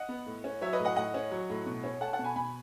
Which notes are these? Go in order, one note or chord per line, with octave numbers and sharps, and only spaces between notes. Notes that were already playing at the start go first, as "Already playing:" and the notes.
Already playing: D#5 F#5
B3
A2
C#4
F#3 C#5 E5
B4 D#5
A2
D#5 F#5
A2 D#5 F#5
C#4
F#3
A2
B2
C#4
A3 F#5 A5
F#5 A5
B2
G#5 B5
B2 G#5 B5